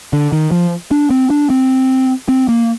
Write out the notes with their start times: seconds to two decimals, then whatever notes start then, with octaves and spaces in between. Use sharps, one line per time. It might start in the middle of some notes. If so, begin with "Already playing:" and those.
0.13 D3
0.32 D#3
0.52 F3
0.91 D4
1.10 C4
1.30 D4
1.50 C4
2.29 C4
2.49 A#3